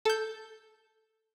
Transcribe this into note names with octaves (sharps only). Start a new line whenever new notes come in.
A4 G6